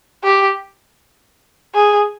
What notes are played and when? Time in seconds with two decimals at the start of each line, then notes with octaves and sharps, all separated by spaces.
0.24 G4
1.75 G#4